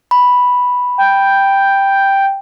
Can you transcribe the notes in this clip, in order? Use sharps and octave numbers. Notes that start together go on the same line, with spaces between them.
B5
G5